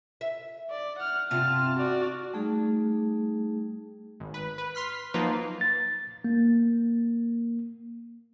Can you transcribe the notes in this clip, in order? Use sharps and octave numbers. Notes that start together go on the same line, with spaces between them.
E5
D5
F#5 F6
G2 C3 F4 A5 F6
F#4 D5
G3 A3 D#4 G#4
G#1
B4
B4
C6 F6 B6
F3 F#3 A#3 D#4 F4 B4
A6
A#3